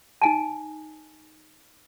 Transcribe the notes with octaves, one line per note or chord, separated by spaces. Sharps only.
D#4 G#5 A5